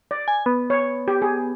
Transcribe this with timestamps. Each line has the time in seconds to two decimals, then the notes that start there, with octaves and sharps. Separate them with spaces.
0.11 D5
0.28 G#5
0.46 B3
0.70 C#5
1.08 G4
1.22 G#4